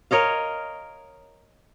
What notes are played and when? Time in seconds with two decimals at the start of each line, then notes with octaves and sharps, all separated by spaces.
0.11 A#4 C#5 D#5 F5